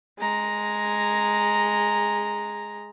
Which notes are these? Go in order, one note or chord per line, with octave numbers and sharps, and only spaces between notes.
G#3 A#5